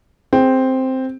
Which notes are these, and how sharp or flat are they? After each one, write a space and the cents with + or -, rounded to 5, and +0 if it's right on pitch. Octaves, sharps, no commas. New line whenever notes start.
C4 +0 G#4 +0